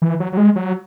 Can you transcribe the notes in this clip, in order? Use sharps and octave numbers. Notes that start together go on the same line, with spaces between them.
E3
F#3
F#3
G#3
F#3